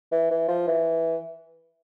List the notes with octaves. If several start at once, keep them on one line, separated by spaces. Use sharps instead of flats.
E3
E3
F3
E3